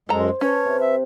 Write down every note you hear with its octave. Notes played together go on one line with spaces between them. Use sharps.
F#2 G#3 A4 C5 A#5
C#4 B4 C#5 A5
C3
E5